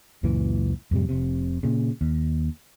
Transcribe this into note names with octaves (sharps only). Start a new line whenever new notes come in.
C#2 F#2 A#2 E3
F2 A2 C3 G3
F1 C3
A#2 C#3
D#2